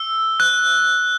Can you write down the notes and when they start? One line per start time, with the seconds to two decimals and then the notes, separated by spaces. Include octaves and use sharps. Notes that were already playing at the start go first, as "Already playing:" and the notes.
Already playing: E6
0.40 F#6